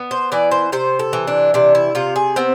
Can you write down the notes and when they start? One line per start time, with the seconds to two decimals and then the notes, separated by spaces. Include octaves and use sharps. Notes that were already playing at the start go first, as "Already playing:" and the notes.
Already playing: B3
0.11 C5
0.32 E3 D5
0.51 C5
0.72 C3 C5
0.99 A4
1.13 E3
1.27 D4
1.54 C3 D4
1.75 E4
1.95 C3 F4
2.16 G#4
2.36 B3 C4